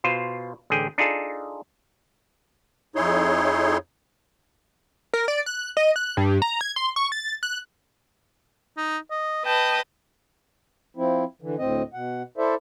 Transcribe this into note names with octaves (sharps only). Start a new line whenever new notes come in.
B2 F4 C5
A1 D3 G#4 G5
D4 D#4 F4 G#4 A4
F2 D#4 E4 G#4 C#5 C6
A#4
D5
F#6
D#5
F#6
G2
A#5
G#6
C6
C#6
A6
F#6
D#4
D#5
B4 D#5 G5 A5
F3 C4 E4
D3 E3
D2 A2 C4 D#5
B2 F#5
E4 A4 C5 D5 E5